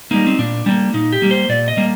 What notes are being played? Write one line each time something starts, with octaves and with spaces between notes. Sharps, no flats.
G3 A#3 D#4
C4
A#2 D4
G3 A#3 D4
A#2 D#4
G4
G3 A#3
C5
A#2 D5
D#5
G3 A#3